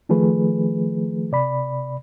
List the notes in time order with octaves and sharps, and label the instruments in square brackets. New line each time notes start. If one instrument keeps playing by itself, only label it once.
[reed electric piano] D#3 F3 A3 G#4 B4
C3 D5 B5